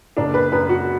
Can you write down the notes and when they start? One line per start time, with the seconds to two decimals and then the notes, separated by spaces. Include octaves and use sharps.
0.17 F#1 D4
0.34 B4
0.52 F#2 B4
0.69 F#4